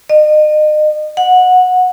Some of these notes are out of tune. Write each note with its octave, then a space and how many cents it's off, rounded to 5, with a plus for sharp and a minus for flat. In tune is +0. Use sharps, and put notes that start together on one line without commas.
D#5 -35
F#5 -15